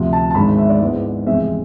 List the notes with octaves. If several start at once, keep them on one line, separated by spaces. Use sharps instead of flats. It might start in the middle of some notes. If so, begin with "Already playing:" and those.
Already playing: D2 C3 F3
A5
A5
G#1 G#2 G#3 D4 B5
E5
D5
G#2 G#3 B3 E4
F1 E2 C3 G#3 C4 E5